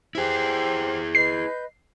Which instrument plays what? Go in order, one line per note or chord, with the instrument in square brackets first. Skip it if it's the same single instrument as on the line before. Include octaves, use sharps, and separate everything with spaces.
[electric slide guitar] E4 G#4 [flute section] G4 C5
[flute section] B4 D#5 G6 [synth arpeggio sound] C7